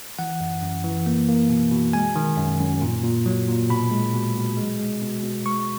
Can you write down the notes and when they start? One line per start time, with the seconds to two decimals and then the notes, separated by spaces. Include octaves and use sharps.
0.19 E3 F#5
0.41 F#2
0.62 F#2
0.84 E3
1.06 A#3
1.29 A#3
1.50 B2
1.72 B2
1.93 G#3 G#5
2.16 D#3
2.38 F#2
2.60 F#2
2.81 A#2
3.04 A#2
3.26 F#3
3.48 A#2
3.70 B2 B5
3.91 G#3
4.13 B2
4.36 B2
4.57 G#3
4.79 G#3
5.01 B2
5.23 B2
5.46 G#3 C#6